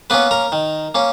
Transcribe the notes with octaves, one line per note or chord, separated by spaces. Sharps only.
A#3 B3 C#4 B4
A#4 A#5
D#3
A#3 C#4